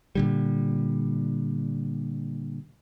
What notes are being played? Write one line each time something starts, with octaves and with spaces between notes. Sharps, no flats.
A#2 D3 G3